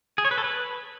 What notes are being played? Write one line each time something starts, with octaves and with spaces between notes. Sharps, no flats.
G#4
C#5
B4
A4
B4